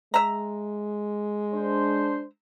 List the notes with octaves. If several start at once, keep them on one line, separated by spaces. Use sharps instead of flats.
G#3 E5 A#5
D4 C5